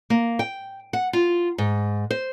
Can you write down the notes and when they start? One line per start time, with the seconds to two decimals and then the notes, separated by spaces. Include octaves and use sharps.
0.10 A#3
0.39 G5
0.93 F#5
1.13 F4
1.58 G#2
2.11 C5